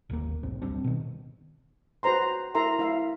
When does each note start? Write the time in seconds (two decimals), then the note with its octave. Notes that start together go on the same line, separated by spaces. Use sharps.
0.10 G1 D#2 A#3
0.43 B1 G#2 C4
0.62 D1 G3 C4 D4
0.84 B2 D#3
2.03 F#4 B4 C5 A#5 C6
2.55 E4 A#4 E5 A#5 C6
2.79 E4 E5 F5